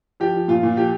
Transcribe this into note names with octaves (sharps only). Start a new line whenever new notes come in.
F3 G4
F3
A#2 F4
A#2
F3 G4